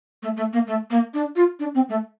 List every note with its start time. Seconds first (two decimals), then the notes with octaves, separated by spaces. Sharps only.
0.23 A3
0.37 A3
0.53 A#3
0.67 A3
0.91 A#3
1.14 D4
1.36 F4
1.60 D4
1.75 C4
1.89 A3